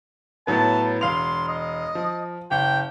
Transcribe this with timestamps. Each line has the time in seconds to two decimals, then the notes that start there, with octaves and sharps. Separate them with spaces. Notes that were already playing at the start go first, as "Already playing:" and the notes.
0.47 A2 F#3 B3 A5
1.01 E1 F5 C6 F7
1.48 D#5
1.95 F3
2.51 F#1 G5